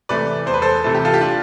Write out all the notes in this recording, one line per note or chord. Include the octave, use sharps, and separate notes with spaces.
C3 E3 A3 B4 D5
E2 C5
B4
A4 C5
C3 E3 A3 A4
G4
F4 A4
G4
D4 F4